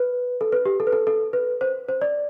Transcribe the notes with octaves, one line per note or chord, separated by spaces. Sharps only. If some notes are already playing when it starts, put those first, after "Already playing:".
Already playing: B4
A4
B4
G4
A4
B4
A4
A4
B4
C5
C5
D5